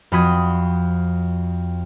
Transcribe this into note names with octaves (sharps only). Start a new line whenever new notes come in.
F2 F#4 B5 D#6 G#6